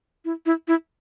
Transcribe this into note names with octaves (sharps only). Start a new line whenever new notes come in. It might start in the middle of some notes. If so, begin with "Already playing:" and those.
E4
E4
E4